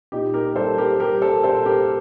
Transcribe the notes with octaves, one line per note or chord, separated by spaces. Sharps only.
A#2 D#4 G4
G4 A#4
G3 A4 C5
G4 A#4
G3 G4 A#4
A4 C5
A#2 A4 C5
G4 A#4